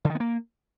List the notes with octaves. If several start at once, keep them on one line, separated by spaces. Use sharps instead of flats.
D3
D#3
B3
A#3